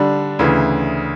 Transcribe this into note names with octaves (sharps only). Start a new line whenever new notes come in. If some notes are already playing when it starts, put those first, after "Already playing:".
Already playing: D3 G3 D4
D2 C#3 E3